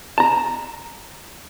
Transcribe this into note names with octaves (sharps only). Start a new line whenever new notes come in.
A5 A#5